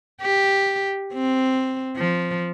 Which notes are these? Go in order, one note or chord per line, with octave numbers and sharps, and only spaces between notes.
G4
C4
F3